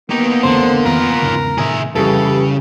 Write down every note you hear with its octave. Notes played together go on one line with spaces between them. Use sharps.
A#3 B3 D#4 G4
A1 F2 A2 D3 C5
F2 D#3 E3 F4 A#4 B4
E2 G#2 C#3
A2 C3 D#3 G#4 E5
F2 C#3 E3 G3 G4 A4 B4